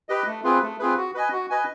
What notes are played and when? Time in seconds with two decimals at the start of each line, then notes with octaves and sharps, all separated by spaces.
0.09 G4 B4 D#5
0.26 A3
0.44 C4 F4 G#4 B4
0.62 A3
0.79 C4 F4 G#4 B4
0.97 F#4
1.14 B4 D#5 G#5
1.32 F#4
1.50 B4 D#5 G#5